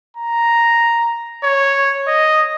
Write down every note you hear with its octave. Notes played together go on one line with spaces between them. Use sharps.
A#5
C#5
D#5